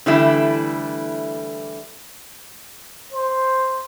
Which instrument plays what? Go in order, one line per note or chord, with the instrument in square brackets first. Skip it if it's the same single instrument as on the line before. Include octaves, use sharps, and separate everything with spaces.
[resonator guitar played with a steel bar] D3 E3 G3 A3 D4 E4
[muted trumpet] C5